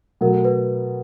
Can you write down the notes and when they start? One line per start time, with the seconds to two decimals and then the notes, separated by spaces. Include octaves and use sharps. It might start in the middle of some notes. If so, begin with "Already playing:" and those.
0.21 B2 F#3 A3 A#4
0.45 B4